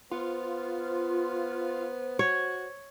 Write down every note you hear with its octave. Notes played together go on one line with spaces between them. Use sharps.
B3 F4 C5
F#4 C#5